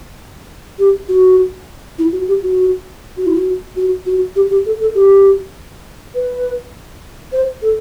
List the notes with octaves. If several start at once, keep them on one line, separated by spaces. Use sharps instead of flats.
G4
F#4
E4
F#4
G4
F#4
F#4
E4
F#4
F#4
F#4
G4
G4
A4
A4
G4
B4
C5
A4